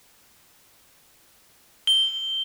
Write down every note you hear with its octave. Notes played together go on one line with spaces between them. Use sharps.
G7